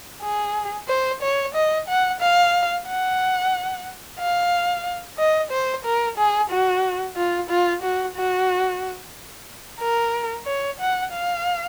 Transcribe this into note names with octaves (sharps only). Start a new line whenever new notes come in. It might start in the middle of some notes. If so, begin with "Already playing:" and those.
G#4
C5
C#5
D#5
F#5
F5
F#5
F5
D#5
C5
A#4
G#4
F#4
F4
F4
F#4
F#4
A#4
C#5
F#5
F5